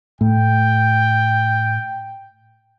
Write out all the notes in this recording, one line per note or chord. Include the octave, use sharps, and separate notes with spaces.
A2 G5